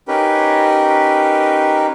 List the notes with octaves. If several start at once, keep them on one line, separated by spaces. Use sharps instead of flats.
C#4 D#4 G4 A#4 B4